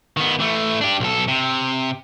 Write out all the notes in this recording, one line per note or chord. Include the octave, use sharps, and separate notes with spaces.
D#3 B3
E3 A3
D4 G4
B1 A4
C3